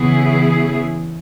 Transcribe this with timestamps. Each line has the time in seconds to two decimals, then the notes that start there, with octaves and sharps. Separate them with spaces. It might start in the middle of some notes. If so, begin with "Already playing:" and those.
Already playing: C#3 E3 B3 E4 G#4